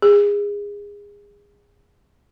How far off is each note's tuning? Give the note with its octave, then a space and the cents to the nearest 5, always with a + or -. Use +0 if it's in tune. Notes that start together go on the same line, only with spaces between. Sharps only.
G#4 -25